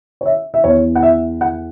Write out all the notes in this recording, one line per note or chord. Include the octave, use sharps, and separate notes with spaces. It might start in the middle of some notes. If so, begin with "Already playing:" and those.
C#5
E5
E5
E2 E3 B3 C#5
F#5
E5
F#5